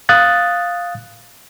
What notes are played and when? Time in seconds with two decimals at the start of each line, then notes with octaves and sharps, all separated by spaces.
0.09 F5 D#6 F#6 A6